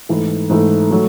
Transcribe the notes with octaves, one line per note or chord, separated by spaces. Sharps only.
G#2 E3 A3
G#2 E3 A3
F#3 A3